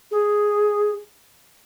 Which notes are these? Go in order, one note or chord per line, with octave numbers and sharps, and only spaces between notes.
G#4